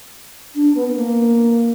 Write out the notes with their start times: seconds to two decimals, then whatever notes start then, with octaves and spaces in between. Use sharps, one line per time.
0.55 D4
0.74 B3
0.87 B3
0.95 A#3